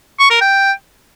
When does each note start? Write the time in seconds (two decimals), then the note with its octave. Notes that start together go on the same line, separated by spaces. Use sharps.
0.19 C#6
0.30 A#4
0.41 G5